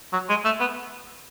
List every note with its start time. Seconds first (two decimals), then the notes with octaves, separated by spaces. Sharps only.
0.13 F#3
0.29 G#3
0.45 A3
0.60 B3